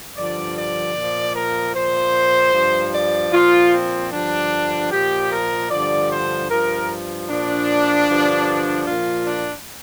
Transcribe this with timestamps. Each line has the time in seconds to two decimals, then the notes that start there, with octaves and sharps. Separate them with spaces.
0.16 G2 D3 F3 D5
0.56 D5
0.96 A#2 F3
1.35 A#4
1.75 A#2 F3 C5
2.54 G2 F3
2.94 D5
3.33 A#2 F3 F4
3.73 C4
4.12 G2 D3 F3 D4
4.92 A#2 F3 G4
5.31 A#4
5.70 G2 D3 F3 D5
6.11 C5
6.50 G2 F3 A#4
7.29 A#2 F3 D4
8.08 G2 D3 F3
8.87 A#2 F3 F4
9.27 D4